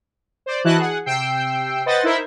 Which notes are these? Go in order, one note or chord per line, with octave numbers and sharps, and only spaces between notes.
C5 D5
E3 E4 F#4 D#5 A5 F#6
G#4 F#5
C3 G5 E6 C7
B4 C5 D#5 F#5 A6
D#4 E4 A#4 C5 E5